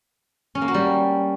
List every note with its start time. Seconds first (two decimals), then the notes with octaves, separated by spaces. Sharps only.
0.55 C#4
0.61 A#3
0.68 F#4
0.74 G3